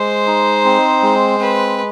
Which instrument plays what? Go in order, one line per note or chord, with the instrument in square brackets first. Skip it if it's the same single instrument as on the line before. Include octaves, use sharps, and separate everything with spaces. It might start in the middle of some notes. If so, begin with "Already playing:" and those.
Already playing: [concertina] G#3 [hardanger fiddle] C5
[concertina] D#4
C4
G#3
[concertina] C4 [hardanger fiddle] B4